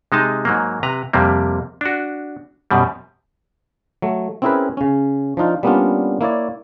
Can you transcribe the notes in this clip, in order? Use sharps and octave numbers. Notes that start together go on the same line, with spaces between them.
C3 G#3 D#4 A5
G#2 F#3 A#3
C3 B4 A#5
F2 C3 G3 A#3
D4 F#4
F#2 B2 G3
F#3 A3
C4 C#4 E4 G#4 A#4 B4
C#3 C#4
F3 D4 D#4 F4
G3 A#3 B3 C#4 D4 F4
A#3 E4 C#5 D5